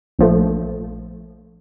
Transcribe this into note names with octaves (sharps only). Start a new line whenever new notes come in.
A#1 F3 A3